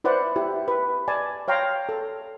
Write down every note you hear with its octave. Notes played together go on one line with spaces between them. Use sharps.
E4 B4 C5 D5 F#5
E4 G4
B4
D5 G#5 A5
C#5 F5 G5 A#5 C6
A4